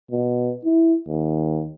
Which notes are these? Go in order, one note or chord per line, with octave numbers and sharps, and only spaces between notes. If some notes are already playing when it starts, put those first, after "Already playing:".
B2
E4
D#2